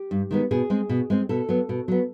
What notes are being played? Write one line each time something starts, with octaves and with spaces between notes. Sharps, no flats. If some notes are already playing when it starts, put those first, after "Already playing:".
Already playing: G4
G2
D#3 G#3 B3
B2 G#4
G#3 C4
B2
G#3 C4
B2 A4
F#3 B3
B2
F#3 B3